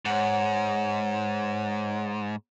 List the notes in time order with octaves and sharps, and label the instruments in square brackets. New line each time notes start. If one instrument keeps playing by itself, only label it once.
[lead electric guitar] G#2 [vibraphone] C#5 F#5